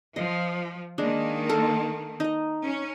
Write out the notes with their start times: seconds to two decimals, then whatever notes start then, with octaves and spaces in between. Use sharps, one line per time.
0.16 F3 D#5
0.98 D#3 G#3 A#3 D4
1.49 A4 A#4
2.20 D#4 D#5
2.64 C#4